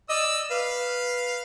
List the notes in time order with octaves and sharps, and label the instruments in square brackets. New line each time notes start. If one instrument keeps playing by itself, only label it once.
[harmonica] D5 E6 [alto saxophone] D#5
[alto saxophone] B4 [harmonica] F5